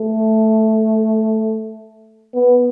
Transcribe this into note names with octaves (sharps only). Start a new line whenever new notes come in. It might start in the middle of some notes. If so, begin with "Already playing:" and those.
Already playing: A3
B3